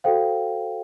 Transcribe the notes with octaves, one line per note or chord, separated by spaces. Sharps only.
F#4 A4 C5 F5 G5